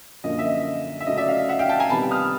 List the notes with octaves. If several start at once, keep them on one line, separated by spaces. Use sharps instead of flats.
F#2 D3 F3 A#3 D#5
E5
D#5
E5
C#3 F#3 A3 D#5
D5 E5
D#5 F5
E5 F#5
F5 G5
G5 A5
G#5 A#5
C3 D#3 G3 B3 A5 B5
D#6 F6